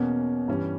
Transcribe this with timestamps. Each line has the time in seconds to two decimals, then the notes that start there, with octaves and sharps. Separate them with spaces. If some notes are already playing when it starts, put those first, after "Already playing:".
Already playing: E2 B2 A#3 C#4
0.48 G2 E3 G3 C#4